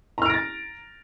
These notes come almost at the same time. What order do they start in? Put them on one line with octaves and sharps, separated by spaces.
A#5 F6 D7 A#6 A6